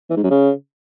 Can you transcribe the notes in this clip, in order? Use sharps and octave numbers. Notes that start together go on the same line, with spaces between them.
E3
G#2
F#2
C#3